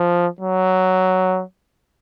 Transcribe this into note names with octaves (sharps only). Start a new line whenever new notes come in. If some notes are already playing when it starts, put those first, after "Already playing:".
Already playing: F3
F#3